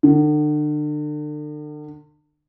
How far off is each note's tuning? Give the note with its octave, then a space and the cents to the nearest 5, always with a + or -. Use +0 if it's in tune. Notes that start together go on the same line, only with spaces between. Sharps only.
D3 +40